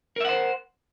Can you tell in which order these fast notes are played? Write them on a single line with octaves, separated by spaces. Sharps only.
A#4 E5 F#5 C5